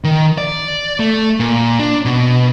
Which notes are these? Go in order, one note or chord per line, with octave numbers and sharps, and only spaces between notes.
D#3
D5
A3
A#2
D4
B2